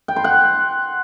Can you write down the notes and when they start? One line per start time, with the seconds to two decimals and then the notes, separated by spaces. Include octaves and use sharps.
0.08 G5
0.16 C6
0.24 F#5